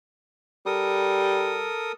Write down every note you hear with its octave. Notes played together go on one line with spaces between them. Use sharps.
G3 A4 A#4 D#6